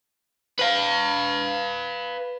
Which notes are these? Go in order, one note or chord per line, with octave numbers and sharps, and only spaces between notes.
B4 F5